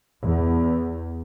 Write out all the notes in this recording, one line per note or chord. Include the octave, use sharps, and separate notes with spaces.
E2